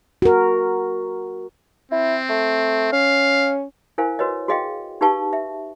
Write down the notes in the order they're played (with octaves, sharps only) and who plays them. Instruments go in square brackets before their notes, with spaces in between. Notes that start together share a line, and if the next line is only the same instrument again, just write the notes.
[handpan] F#4 A#4
[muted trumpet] C4 [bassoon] E4
[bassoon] A3
[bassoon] C#4 [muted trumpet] F5
[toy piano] E4 A#4 C5 F5 G#5
F#4 B4 C#5 D#5
F#4 G#4 D#5 F5 G5
D#4 G4 B4 F5 A5 C#6
E5